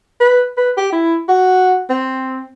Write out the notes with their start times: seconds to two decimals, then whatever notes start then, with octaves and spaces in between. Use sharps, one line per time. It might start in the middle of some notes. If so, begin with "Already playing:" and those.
0.21 B4
0.57 B4
0.77 G4
0.92 E4
1.29 F#4
1.90 C4